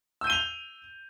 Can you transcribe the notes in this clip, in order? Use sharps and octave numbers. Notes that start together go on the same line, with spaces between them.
E6 G6 D#7 F7 G7